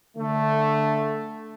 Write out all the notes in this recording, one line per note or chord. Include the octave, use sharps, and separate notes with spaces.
D3 A3